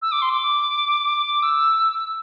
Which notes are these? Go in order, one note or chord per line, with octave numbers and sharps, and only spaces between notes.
E6
D6
C6
D6
E6